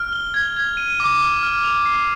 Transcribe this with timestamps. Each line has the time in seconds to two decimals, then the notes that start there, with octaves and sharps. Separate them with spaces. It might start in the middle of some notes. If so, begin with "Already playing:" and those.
Already playing: F6
0.13 G7
0.34 G#6
0.57 G#6
0.77 D#7
1.00 D6
1.22 F6
1.43 F6
1.64 F7
1.86 C7